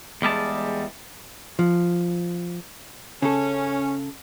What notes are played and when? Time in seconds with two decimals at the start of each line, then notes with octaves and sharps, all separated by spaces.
0.22 E2 G3 G#3 A5
1.59 F3
3.22 C#3 C#4 A4